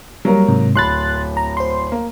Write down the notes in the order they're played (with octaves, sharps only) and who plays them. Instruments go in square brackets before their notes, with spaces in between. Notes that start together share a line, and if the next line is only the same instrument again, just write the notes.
[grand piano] F#3 A#3 A#4 [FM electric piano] G3
[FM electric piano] G#2 C3
[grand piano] D1 B5 [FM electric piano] C6 F#6 A6
[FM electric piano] A#5
C5 C6
[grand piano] A#3